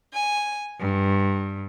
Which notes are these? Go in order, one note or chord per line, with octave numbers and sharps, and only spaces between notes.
G#5
G2